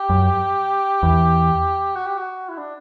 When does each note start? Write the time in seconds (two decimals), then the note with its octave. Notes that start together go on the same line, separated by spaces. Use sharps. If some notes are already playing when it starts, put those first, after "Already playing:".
Already playing: G4
0.10 F#2
1.03 E2
1.96 F#4
2.06 G4
2.17 F#4
2.49 E4
2.58 D4